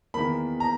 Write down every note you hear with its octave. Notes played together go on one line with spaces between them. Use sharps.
E2 D#3 A#3 B5
A#5